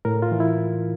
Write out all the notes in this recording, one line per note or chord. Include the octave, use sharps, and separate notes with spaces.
A2 A#4
F4
E3
E4